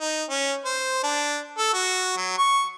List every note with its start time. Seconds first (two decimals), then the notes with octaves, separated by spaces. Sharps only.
0.01 D#4
0.30 C#4
0.65 C5
1.04 D4
1.58 A4
1.74 F#4
2.17 F#3
2.38 C#6